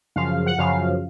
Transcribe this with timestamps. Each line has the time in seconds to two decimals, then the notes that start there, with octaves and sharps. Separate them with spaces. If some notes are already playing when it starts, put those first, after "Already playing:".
0.16 F#2 C#3 F3 F5
0.46 F#5
0.58 F#2 C#3 F3 F5